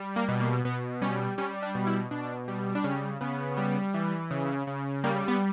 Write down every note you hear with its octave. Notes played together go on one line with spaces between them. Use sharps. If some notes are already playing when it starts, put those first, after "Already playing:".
Already playing: G3
A#3
B2
A#3
B2 B3
G3 C#4
G3 C#4
D4
B2
E4
B2 D4
G3
D4
C#3 C#4
C#3 B3
G3
E3
C#3
C#3
G3 A#3
B3